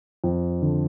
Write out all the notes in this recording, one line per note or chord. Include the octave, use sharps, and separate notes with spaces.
F2
D3